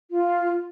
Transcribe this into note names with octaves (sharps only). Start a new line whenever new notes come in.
F4